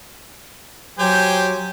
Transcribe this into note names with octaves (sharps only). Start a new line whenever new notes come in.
F#3 G4 C5 G#5